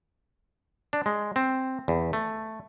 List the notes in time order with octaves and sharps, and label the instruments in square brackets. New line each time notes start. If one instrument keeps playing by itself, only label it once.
[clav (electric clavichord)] D4
G#3
C4
E2
A3